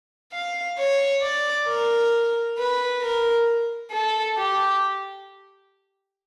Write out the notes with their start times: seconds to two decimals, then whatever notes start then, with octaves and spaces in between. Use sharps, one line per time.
0.33 F5
0.78 C#5
1.22 D5
1.68 A#4
2.58 B4
3.02 A#4
3.91 A4
4.37 G4